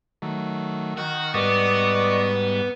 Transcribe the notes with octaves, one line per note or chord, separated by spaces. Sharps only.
D#3 F#3 A3
D#3 F#4
G#2 G3 B3 D5 D#5 C#6